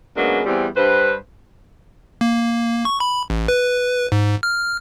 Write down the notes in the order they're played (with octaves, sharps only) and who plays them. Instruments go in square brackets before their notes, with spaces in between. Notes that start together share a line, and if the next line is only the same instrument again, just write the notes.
[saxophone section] C#3 F#3 G#3 A#3 B3 D4
E2 G3 C4
G2 B4 C5
[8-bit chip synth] A#3
C#6
B5
A1
B4
G#2
F6